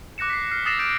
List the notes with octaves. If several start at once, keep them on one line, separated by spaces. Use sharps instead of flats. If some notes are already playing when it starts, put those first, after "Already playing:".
D6 F#6 A#6 C#7 E7
B6 C7
F6 C7
D#6 E6 A6 A#6 C7 E7
G6 A6 D7